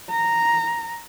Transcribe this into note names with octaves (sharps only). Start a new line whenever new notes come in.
A#5